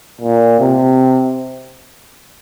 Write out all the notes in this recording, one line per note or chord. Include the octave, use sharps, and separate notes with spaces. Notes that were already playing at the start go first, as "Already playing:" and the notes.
A#2
C3